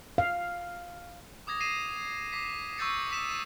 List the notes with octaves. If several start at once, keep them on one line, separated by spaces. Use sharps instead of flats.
F5
D6 D#6 G#6 A#6
A#6 C7 D#7 E7
D6 B6 C7
C#6 E6 G6 A6 C#7
D#6 B6 E7